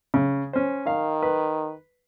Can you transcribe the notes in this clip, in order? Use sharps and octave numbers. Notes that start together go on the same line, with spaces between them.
C#3
C#4 C5
D#3 F5
B4